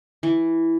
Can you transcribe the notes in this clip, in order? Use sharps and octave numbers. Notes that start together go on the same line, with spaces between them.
E3